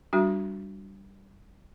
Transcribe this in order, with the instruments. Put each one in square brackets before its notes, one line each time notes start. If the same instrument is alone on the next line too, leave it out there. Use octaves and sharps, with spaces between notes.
[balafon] G3 D4 F#4